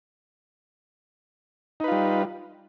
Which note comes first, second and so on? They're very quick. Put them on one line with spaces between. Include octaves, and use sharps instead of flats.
D#4 B4 F4 G3